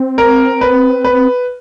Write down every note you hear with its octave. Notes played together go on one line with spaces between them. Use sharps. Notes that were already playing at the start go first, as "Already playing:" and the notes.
Already playing: C4
A#4
B4
B4